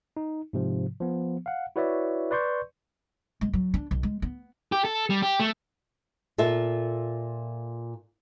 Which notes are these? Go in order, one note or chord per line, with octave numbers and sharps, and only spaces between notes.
D#4
G#2 C3 F3
F3 B3
F5 F#5
E4 F#4 B4 C#5 D5 E5
B4 D5 C6 C#6 G6
G#3
F#3
D4
B1
G#3
B3
G4
A4
G3
G4
A3
A#2 F4 A4 E5